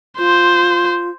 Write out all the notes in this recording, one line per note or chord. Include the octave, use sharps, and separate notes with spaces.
F4 C5